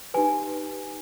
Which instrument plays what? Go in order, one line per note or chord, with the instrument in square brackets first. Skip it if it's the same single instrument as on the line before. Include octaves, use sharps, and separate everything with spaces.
[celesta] D#4 G4 B4 G#5